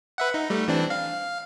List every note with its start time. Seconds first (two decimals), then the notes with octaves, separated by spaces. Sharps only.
0.18 B4 E5 F#5
0.34 D#4
0.50 G3 A3
0.68 E3 C4 D4
0.90 F5